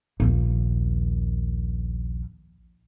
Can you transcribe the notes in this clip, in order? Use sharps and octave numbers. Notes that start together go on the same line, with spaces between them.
A#1 D#2